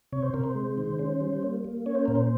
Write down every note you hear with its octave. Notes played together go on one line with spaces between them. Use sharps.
C3 C#5
C5
C3 A#4
C5
G#3
D#3
C#4
G3
A#3
A#3
C#4 C#5
C5
A#2 A#4
C5